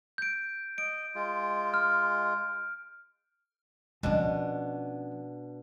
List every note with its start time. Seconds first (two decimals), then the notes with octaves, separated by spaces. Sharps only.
0.18 G6 D7
0.78 D#5 D7
1.15 G#3 F4
1.74 F6
4.03 B2 F3 C#4 D4